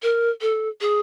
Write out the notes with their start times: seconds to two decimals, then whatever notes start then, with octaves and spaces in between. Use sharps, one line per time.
0.03 A#4
0.41 A4
0.81 G#4